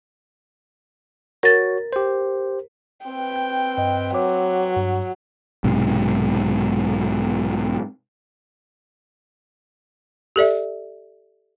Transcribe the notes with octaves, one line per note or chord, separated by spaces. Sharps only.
F#4 A#4 C#5 A6
G4 C5
C4 B4 G5
G6
G2 D#5
F#3 C#5 D6
G2
B1 G#2 C3
G4 A4 D5 E5